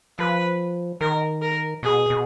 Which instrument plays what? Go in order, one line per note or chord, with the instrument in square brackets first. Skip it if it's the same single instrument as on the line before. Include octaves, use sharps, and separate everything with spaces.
[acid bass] F3 [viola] B4
[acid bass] D#3 [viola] A#4
[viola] A#4
[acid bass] B2 [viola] G#4
[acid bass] B2